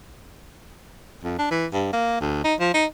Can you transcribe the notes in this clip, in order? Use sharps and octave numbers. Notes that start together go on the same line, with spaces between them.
F2
D4
E3
G2
A#3
D2
D#4
F3
D#4